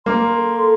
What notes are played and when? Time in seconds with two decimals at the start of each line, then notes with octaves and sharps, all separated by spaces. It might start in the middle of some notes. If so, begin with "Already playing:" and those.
0.06 A#3 C6
0.37 A4